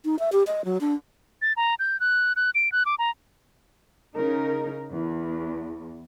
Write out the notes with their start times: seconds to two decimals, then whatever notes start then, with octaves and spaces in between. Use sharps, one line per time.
0.05 D#4
0.19 E5
0.32 G4
0.47 D#5
0.65 F#3
0.81 D4
1.42 A6
1.57 A#5
1.79 G6
2.00 F#6
2.36 F#6
2.55 D7
2.72 F#6
2.86 D6
2.99 A#5
4.16 C#3 D#4 A#4
4.90 E2